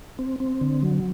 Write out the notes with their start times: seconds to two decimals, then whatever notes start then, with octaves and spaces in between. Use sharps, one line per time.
0.19 C4
0.40 C4
0.61 D3
0.83 F#3